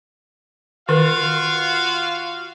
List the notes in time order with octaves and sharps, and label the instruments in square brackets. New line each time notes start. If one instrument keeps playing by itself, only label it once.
[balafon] D#3 A#4 [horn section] F4 F#4 F5